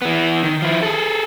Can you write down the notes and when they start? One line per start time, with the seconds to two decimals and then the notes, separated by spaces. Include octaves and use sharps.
0.02 E3 B3
0.43 D#3
0.62 F3 E4
0.83 G#4 A4